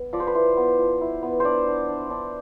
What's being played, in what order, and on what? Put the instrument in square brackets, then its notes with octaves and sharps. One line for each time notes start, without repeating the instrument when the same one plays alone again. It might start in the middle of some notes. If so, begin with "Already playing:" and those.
Already playing: [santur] B3
F3 D5
C5
B4
E4 C5
B3
F3
E4
B3
D4 C5 D5
D4
D4
D4